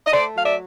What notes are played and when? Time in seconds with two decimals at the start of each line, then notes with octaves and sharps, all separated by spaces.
0.07 D#5
0.12 A3 C5 D5
0.35 F#3 F5
0.44 D5 E5